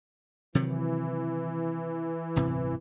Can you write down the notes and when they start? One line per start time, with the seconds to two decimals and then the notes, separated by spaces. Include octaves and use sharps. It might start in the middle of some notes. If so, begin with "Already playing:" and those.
0.55 C3 D#3 E3 F#3
2.36 D1 G1 C3